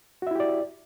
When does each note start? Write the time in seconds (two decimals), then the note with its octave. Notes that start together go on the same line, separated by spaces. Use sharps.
0.22 F#4
0.27 E5
0.31 E4
0.35 G4
0.40 D5